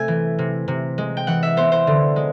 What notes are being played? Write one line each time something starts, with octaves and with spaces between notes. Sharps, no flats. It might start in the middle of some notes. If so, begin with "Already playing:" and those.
Already playing: C3 A3 G#5
E3
C3
C3
G#3
G5
E3 F#5
E5
B3 C5
C5
D3
G#3